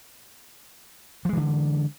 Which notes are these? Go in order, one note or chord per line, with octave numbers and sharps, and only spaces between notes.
D3 E3 F3 G#3